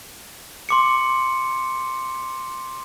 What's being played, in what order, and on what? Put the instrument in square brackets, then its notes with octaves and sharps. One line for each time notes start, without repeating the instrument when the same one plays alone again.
[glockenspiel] C6 D6 C#7